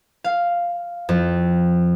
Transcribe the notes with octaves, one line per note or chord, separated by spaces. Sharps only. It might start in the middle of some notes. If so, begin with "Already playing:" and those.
F5
F2